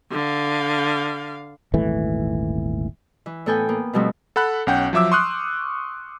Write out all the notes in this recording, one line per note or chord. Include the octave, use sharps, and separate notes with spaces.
D3 F5
D#1 G#1 E3 A3
E3
A2 B3 A4 G5 G#5 G6
A#3 B3
B2 F3 G3 A3 C4
A4 F#5 B5 F#6
B1 C#4 F#5 G5 G6
F3 F#3 E5 D6 E6
C6 C#6 D#6 F6 F#6